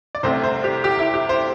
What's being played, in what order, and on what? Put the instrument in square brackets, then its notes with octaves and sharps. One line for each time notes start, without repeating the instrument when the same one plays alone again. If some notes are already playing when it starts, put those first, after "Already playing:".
[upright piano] D5
C2 C3 A3 C4 C5
C5
G4
G4
E4
G4
C5